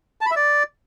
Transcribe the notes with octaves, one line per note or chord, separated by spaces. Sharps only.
A5
B5
E5
D5